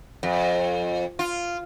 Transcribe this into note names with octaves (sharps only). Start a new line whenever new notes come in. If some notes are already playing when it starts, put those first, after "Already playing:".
F2
F4